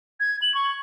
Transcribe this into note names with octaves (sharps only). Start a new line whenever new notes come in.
G#6
F#7
C#6